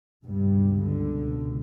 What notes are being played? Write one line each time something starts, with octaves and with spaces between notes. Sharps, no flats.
C#2 G2 B2 G3
D3